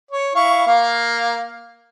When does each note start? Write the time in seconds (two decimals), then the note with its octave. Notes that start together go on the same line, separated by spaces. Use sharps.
0.11 C#5
0.35 E4 F5 C#6
0.67 A#3 F5